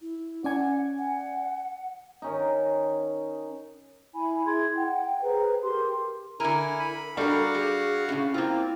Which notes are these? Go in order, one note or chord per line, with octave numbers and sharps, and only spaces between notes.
E4
C#4 D5 F#5 G#5
F#5
D#3 C#4 D#4
E4 G#5 B5
E4 G#4 C6 G#6
F#5 G5
G#4 B4 C5 A#5
G4 A#4 C6
D3 E4 A#4 G#5
B5
G3 D4 F#4 A4 A#4 F5 F#5
G3 G#4
A2 C#3 C#4
A#3 C4 E4 F4